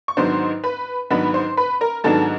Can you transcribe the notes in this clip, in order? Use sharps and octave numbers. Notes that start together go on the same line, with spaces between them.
C#6
G#2 D#3 F#3 B3 D4 C5 C6
B4 B5
G#2 D#3 F#3 B3 D4 B4 B5
C5 C6
B4 B5
A#4 A#5
G#2 D#3 F#3 B3 D4 A4 A5